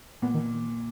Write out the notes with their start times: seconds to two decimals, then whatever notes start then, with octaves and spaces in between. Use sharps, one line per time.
0.22 A#2 B3
0.34 D#3